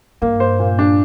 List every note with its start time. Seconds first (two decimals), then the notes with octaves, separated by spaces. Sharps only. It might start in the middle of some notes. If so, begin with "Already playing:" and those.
0.22 G2 A#3
0.40 C5
0.59 A#2
0.79 D4